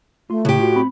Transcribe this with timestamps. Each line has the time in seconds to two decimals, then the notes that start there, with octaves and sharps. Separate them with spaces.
0.30 A3 F4 C6
0.45 A2 C#3 G4
0.60 F4 F#4
0.76 C4 B5